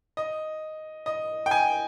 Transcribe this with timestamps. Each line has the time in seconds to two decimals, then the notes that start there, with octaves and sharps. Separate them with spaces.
0.17 D#5
1.06 D#5
1.46 G5
1.51 G#5